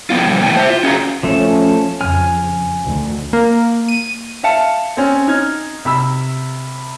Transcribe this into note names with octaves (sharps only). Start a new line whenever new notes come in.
F3 G3 B3 F4
B2 F3 G3
E2 A2 G3 G5 A5
C5 E5
F4
C#4 F#4 G#4 C5 F5 A#5
F3 A3 C#4 A4
F2 C#3 G#5 F6
D2 D#3
A#3
D#7
E5 F5 A5 C#7
C4 C#4
D#4 F6 G#6
C3 B5 E6